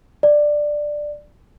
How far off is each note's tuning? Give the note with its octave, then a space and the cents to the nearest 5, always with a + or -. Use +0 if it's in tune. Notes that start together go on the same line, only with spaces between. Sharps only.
D5 +10